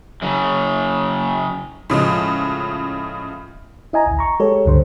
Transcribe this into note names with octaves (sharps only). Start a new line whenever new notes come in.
C#3 F#3
A2 C#3 F3 G#3
E4 D#5 G#5 A#5
A1 D2
A#5 C#6
G#3 G4 A4 C#5
C#2 G2 D3 C5